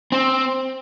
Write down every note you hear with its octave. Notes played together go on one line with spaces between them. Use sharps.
C4